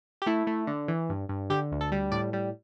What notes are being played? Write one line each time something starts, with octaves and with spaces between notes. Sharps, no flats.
G4
A3 E4
A3
D3
E3
G2
G2
D3 G4
D2
A4
G3
A2 D5
G3